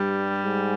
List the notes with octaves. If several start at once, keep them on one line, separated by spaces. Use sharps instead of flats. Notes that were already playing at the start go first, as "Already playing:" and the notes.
Already playing: G2 G3
G#2